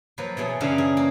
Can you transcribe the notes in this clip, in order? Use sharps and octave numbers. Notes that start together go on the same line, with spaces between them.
F3 F#3 A#3 B4
B2 E3 G#4 C#5
F#2 C#3 E3 D4 F5 F#5
G#4
A#3